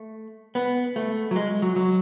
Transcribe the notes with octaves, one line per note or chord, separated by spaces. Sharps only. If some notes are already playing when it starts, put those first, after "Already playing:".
Already playing: A3
B3
A3
F#3
G#3
F#3
F#3